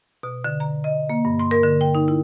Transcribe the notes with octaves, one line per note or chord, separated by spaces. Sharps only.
B2
D3
A#5
D#5
A#3
G2
C6
A#4
D3
G5
D#4
E4